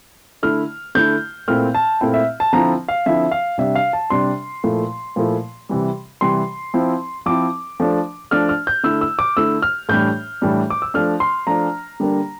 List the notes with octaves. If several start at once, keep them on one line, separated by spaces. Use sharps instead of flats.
D3 A3 E4 F6
D3 A3 E4 G6
A#2 A3 C4 E4 F6
A5
A#2 A3 C4 E4 G5
E5
A5
D3 F3 C4 E4 A#5
F5
D3 F3 C4 E4 E5
F5
C3 G3 D4 E5
F5
A5
C3 G3 D4 C6
A#2 F3 A3 E4
A#2 F3 A3 E4
C3 E3 G3
C3 E3 G3 C6
F3 C4 E4
F3 C4 E4 D6
F3 A3 D4
F3 A3 D4 F6
F6
G6
D3 A3 E4 E6
E6
D6
D3 A3 E4 E6
F6
A2 E3 G3 D4 G6
A2 E3 G3 D4
D6
E6
F3 A3 D4 F6
C6
F3 A3 D4 A#5
D3 G3 A#3 D4